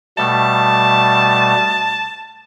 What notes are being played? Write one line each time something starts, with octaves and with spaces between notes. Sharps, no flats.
B2 G3 A3 A5